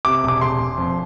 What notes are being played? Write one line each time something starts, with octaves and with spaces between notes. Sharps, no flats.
C3 D6
E1
D6
E1 C6
E1
F2